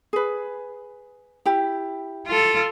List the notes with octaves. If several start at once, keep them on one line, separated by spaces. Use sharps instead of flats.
G#4 B4
E4 G4
F4 A4